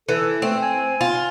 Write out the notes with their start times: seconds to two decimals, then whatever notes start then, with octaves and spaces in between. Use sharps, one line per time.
0.09 E3 A4
0.42 A3 C4
0.62 G#5
1.01 F4